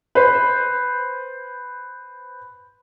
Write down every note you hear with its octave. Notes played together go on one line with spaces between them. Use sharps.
B4 C5